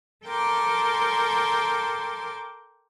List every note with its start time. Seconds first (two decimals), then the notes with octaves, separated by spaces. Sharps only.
0.25 A4 A#4 G5 C6 D6